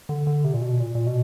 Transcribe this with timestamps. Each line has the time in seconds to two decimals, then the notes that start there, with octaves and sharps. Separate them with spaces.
0.09 D3
0.27 D3
0.44 C3
0.54 A#2
0.62 B2
0.80 A#2
0.95 A#2
1.07 B2